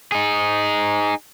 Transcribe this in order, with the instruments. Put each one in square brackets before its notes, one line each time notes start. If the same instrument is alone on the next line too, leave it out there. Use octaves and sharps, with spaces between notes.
[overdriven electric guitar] D#4 G#4